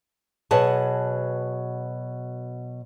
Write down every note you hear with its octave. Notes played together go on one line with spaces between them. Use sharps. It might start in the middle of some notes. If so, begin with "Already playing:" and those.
B2 F#3 G#4 B4 A5